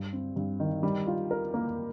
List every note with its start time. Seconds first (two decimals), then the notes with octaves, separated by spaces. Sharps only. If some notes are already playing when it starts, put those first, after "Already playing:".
Already playing: G2
0.13 C4
0.36 G2
0.60 D#3
0.83 G3
1.07 F4
1.31 A#4
1.54 A#3